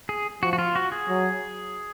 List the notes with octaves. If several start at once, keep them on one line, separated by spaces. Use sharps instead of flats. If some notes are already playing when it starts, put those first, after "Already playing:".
G#4
F3 F#4
F#4
F4
F#4
G#4
F#3